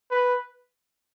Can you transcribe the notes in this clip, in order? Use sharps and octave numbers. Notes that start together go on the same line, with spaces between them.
B4